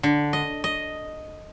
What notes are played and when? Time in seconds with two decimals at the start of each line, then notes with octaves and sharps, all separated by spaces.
0.03 D3
0.33 D#5
0.64 D#5